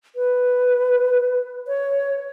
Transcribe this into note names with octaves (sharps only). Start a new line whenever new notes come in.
B4
C#5